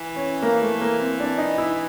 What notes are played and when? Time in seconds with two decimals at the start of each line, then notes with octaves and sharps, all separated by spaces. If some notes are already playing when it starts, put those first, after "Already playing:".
Already playing: E3
0.16 C#4
0.42 A#3
0.62 A3
0.81 A#3
1.00 C4
1.20 D4
1.38 D#4
1.58 E4